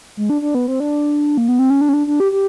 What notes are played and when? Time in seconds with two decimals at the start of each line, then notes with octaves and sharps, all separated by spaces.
0.17 G#3
0.30 D4
0.42 D4
0.55 B3
0.68 C4
0.80 D4
1.37 A#3
1.48 B3
1.59 C4
1.70 C#4
1.81 D4
1.89 C#4
1.93 D4
2.07 D4
2.20 G4
2.32 G4